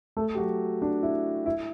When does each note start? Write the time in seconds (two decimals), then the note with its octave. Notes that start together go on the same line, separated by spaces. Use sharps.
0.17 A3 A4
0.34 G4
0.38 F#3 F#4
0.82 D4
1.03 E4
1.46 E4